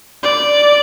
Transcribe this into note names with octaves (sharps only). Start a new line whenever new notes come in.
D5